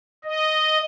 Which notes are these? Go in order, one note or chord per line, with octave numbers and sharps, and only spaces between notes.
D#5